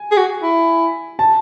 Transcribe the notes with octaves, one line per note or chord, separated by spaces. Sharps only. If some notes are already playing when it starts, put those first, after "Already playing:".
Already playing: G#5
G#4
F#4
E4
A5